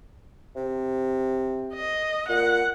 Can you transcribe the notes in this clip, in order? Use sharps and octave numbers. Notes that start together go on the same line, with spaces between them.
C3
D#5
A#2 F#5